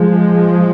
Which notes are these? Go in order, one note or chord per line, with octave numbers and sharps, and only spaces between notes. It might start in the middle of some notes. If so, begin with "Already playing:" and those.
Already playing: F3 G#3